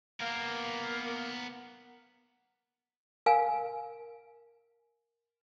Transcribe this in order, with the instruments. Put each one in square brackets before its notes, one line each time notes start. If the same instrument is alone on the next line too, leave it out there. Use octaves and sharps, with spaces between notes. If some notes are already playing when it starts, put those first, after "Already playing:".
[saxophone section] A#3 [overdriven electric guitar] B3 A#4
[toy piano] A#4 F5 G#5